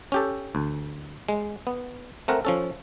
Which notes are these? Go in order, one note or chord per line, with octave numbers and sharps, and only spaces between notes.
C#4 G4 A4
D2
G#3
B3
A3 C4 A#4 F#5
F3 C#4 A4